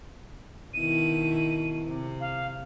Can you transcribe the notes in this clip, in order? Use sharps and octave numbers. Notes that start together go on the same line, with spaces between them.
B2 D#3 E4 D#7
C3
F5